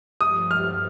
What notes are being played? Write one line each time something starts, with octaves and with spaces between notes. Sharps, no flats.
G2 F3 A3 D#6
F6